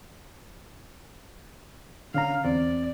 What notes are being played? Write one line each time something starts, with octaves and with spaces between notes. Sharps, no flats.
D3 C#4 F5 A#5
E2 C4 D5